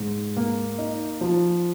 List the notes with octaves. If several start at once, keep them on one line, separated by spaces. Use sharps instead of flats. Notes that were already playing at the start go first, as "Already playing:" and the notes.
Already playing: G#2
A#3
D#4
F3